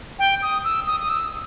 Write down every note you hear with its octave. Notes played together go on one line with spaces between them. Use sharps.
G5
D#6
E6
D#6
D#6
E6